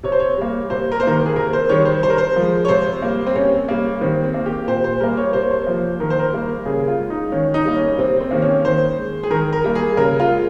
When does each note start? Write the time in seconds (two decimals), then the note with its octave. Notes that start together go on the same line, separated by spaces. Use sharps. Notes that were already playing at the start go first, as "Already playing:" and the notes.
0.03 C3 C#5
0.12 C5
0.20 C#5
0.38 G3 A#3
0.70 C3 C5
0.92 A#4
1.00 C5
1.03 D#3 A#3 A#4
1.26 G#4
1.36 C3 A#4
1.53 C5
1.69 D#3 G3 C#5
1.85 C5
2.03 C3 C5
2.10 A#4
2.18 C5
2.36 F3 G#3
2.65 C#5
2.68 C3 C5
3.02 G3 A#3
3.27 C4
3.35 C3 C#4
3.69 G3 A#3
4.01 D#3 C4
4.24 C4
4.34 A#3
4.46 G4
4.67 A#2 C5
4.84 C5
5.00 G3 A#3 A#4
5.17 C#5
5.33 C3 C5
5.42 C#5
5.51 C5
5.67 F3 A#3
6.00 D#3 A#4
6.10 C5
6.19 A#4
6.33 G3 A#3
6.66 C#3 G#4
6.88 F4
6.99 G#3
7.10 D#4
7.32 D#3 C#4
7.54 D#4
7.65 G3 A#3
7.76 C#4
7.98 C3 C4
8.20 C4
8.31 D#3 A#3
8.42 C#4
8.65 D#3 C5
8.98 G#3
9.23 G#4
9.30 D#3 A#4
9.53 A#4
9.64 G3 A#3
9.75 G#4
9.97 C#3 A#4
10.20 F4
10.30 G#3